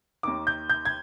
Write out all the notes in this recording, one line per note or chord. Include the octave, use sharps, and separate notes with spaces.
D#2 D#3 D6
G6
G6
G#6